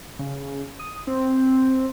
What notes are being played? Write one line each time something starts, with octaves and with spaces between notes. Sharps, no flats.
C#3
D#6
C4